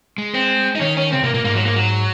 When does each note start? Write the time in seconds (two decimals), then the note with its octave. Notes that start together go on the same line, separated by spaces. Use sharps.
0.18 G#3
0.34 C4
0.75 D#4
0.81 D#3 C#4
0.97 C#4
1.12 C#3 C4
1.23 C3 A#3
1.34 A#2 A#3
1.44 G#2 A#3
1.55 F#3
1.65 A#3
1.76 F#3